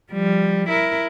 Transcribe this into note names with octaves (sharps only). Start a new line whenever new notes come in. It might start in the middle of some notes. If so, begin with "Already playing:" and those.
F3 G3
E4 A#4